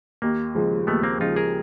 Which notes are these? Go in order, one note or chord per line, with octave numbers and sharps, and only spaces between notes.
D#2 A#3
C#3 F3 G#3
D#2 A3 B3
A#3 C4
C#3 F3 G#3 D#4 F4
G#4 A#4